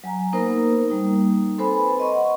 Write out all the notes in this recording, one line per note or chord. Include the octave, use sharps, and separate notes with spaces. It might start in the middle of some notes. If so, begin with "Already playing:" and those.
F#3 G#5 A#5
A#3 B3 D#4 A#4 C5
G3 A#3 D#4
C4 A4 B4 C5 G#5 B5
D#5 C6 C#6
F#5